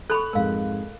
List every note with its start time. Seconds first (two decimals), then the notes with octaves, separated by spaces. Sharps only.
0.10 A4 B5 C#6 F#6
0.33 F2 G#2 G#3 A#4 F5